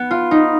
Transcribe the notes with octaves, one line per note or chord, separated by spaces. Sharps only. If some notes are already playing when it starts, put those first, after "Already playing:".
Already playing: B3
F4
D#4